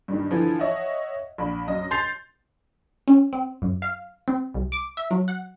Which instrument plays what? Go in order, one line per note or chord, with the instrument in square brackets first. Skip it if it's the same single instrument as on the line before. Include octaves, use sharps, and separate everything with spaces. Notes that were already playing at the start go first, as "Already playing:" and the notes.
[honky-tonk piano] G2 D#3
D3 E3 F3
C#5 D#5 E5 F#5
A#1 B5
F#2 D#5
C6 G6 A6 C7 F7
[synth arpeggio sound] C#4
C4
F#2
F5
C4
C2
D6
E5
F#3
F#5